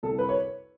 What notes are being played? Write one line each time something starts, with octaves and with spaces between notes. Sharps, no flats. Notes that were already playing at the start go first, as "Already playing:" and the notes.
C2 A4
B4
C#5